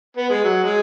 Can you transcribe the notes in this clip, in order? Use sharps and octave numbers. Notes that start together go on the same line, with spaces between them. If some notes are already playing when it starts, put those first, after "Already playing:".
B3
G#3
F#3
G#3